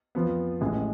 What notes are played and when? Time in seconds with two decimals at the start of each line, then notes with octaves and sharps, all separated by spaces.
0.15 F2 F3 B3
0.61 A1 A2 G#3